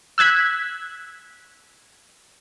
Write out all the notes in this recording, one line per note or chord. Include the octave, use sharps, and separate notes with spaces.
E6 F#6 G#6 B6